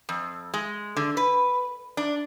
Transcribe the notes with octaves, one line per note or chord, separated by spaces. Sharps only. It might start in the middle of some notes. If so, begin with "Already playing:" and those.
F2
G#3
D3
B4
D4